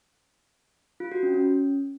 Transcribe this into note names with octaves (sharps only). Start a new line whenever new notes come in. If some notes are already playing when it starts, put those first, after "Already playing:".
F4
F#4
C#4
C#4